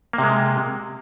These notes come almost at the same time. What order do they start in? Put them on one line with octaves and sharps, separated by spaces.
A#3 C3 G#3